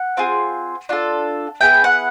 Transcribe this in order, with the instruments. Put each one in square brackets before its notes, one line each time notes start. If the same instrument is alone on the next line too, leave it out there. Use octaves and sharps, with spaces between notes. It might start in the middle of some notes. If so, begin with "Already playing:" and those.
Already playing: [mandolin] F#5
C4 F4 G#4
D4 F4 A4
B3 E4 G#4 G5
F#5